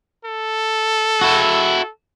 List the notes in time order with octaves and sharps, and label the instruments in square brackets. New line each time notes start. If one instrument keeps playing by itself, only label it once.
[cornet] A4
[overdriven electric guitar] E4 F#4